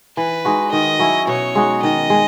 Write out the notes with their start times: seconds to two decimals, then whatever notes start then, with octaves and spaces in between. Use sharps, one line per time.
0.17 E3 B4
0.45 G#3 D#4 F#4
0.72 D#3 D#5
0.99 F#3 C#4 E4
1.27 B2 C#5
1.55 G#3 D#4 F#4
1.83 D#3 D#5
2.10 G#3